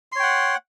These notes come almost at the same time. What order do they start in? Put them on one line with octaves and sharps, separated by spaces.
C6 C#5 G5 F#5